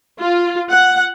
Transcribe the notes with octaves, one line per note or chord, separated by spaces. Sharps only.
F4
F#5